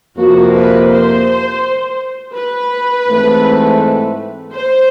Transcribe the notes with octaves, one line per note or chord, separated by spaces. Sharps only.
F2 C3 F3 A#3 F#4
B4
C5
B4
G#2 E3 A3 C4
C5